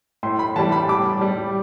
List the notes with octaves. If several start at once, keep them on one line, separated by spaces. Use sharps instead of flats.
A2 C6
B5
E3 G3 A5
B5
A2 D6
G3